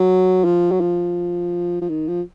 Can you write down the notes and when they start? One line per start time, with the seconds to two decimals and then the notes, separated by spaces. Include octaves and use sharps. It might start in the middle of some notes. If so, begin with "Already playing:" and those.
Already playing: F#3
0.45 F3
0.71 F#3
0.81 F3
1.81 F3
1.89 D#3
2.08 F3